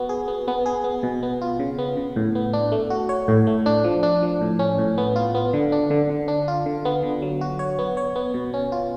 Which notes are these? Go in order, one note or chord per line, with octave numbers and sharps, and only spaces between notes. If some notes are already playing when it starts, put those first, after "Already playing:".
Already playing: B3 F#4
G#4
B3
B3
G#4
B3
B2
B3
F4
C#3
B3
C#3
A2
B3
D4
A3
F#4
C#5
A2
A3
D4
F3
D4
F3
A2
C#4
A2
B3
F4
B3
D3
D4
D3
D3
D4
F4
D3
B3
D3
F#3
F#4
C#5
B3
C#5
B3
B2
C#4
F4